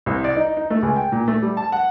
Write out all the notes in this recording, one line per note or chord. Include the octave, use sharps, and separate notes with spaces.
C2
D5
D#4
D#4
A3
C#2
G5
A#2
A3
G3
A5
F#5